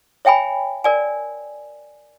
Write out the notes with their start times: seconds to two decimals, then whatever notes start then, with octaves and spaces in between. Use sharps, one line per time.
0.25 C#5 E5 G5 G#5 B5
0.84 A#4 D5 G#5